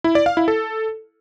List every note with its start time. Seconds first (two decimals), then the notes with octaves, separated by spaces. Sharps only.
0.04 E4
0.15 D5
0.26 F5
0.37 E4
0.48 A4